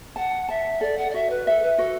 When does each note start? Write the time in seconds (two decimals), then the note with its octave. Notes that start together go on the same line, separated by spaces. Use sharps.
0.16 F#5 A5
0.49 E5 A5
0.81 A4 D5
0.97 F#5
1.10 D5
1.14 F#4 E5
1.30 B4
1.47 A4 E5
1.62 B4
1.78 F#4 A4